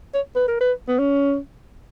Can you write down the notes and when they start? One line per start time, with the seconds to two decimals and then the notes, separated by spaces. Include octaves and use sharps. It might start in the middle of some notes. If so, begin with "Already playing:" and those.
0.14 C#5
0.36 B4
0.48 A#4
0.61 B4
0.89 B3
0.99 C#4